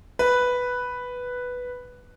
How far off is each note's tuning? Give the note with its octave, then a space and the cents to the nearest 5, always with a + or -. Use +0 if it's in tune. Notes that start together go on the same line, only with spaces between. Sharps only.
B4 +0